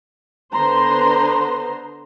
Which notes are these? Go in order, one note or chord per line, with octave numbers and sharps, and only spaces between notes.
D3 B3 B4 C5 A#5 C6